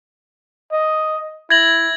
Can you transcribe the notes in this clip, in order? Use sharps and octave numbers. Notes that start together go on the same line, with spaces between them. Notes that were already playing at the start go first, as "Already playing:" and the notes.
D#5
E4 G#6 A#6 F#7